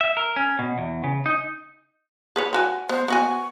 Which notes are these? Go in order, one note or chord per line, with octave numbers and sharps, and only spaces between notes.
E5
A#4
C#4
B2
E2
C#3
D#4
G#4 B4 C#5
C4 F#4 G#5
B3 C5
B3 F#4 G#5 C#6